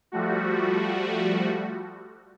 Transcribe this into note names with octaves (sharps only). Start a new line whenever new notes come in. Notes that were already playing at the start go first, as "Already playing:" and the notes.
F3 G3 A3 F#4